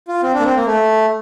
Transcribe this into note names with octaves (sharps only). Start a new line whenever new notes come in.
F4
C4
D4
A#3
C4
A#3
A3